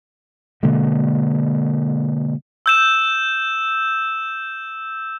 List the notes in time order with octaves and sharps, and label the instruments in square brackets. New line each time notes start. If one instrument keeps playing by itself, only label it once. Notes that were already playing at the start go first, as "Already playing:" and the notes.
[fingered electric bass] B2 D3 G#3 A#3
[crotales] E6 G6 E7